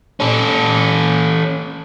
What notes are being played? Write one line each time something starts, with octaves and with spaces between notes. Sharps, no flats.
C#4 A4